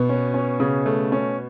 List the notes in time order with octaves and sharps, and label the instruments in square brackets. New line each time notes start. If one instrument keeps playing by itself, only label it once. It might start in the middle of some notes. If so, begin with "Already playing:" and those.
Already playing: [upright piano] B2 B3
[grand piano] C#4
C#4
C#3
A3
C#4